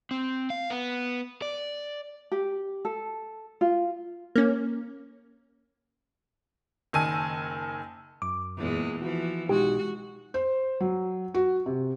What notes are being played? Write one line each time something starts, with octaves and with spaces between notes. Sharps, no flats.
C4
F5
B3
D5
G4
A4
F4
A#3 C#4
F#1 D#3 G#5 A5 E6 D#7
F#2 D6
E2 A#2 G#3
E3 F3 F#4
B1 G#3 D#4 F#4 G4
C5
F#3
F#4
C3